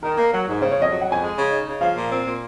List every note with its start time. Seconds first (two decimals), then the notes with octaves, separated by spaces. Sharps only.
0.03 D#3 A#4
0.17 A#3
0.33 F#3
0.48 G#2
0.62 C#3 C5
0.71 C#5
0.77 F2 D#5
0.91 F#3
1.01 F#5
1.07 F2 G#5
1.22 G#3
1.36 C#3
1.51 D#4
1.67 C#3
1.81 F3 F5
1.96 A#2
2.10 C4
2.25 A#2